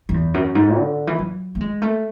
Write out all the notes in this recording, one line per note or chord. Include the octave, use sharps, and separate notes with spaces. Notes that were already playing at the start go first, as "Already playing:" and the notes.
F#2
E2
F#2
G#2
D3
E3
F#3
A3
G#3
A3